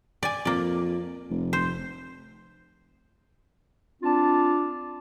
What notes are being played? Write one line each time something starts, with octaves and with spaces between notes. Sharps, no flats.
D5 G#5
F2 A#3 D5
F1
C5
C4 D4 F4 A5